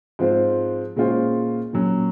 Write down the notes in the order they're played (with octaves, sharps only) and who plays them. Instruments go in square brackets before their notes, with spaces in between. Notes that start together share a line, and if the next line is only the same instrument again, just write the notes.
[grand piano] G#2 F3 C4 F4 C5
A#2 G#3 C#4 F4 C5
A#2 F#3 C#4